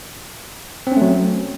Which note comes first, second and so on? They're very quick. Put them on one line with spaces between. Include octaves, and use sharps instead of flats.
C4 C#4 A3 F#3